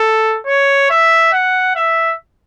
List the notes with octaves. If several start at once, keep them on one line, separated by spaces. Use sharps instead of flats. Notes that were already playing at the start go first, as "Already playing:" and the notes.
Already playing: A4
C#5
E5
F#5
E5